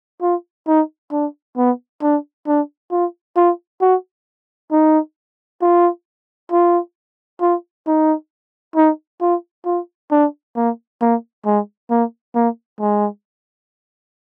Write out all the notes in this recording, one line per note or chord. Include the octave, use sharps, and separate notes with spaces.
F4
D#4
D4
B3
D4
D4
F4
F4
F#4
D#4
F4
F4
F4
D#4
D#4
F4
F4
D4
A#3
A#3
G#3
A#3
A#3
G#3